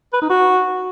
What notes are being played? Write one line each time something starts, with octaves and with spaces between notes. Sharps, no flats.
B4
D#4
F#4